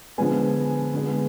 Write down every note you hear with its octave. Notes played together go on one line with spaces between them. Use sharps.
D3 F3 G#3 B3 G#5
D3 G#3 B3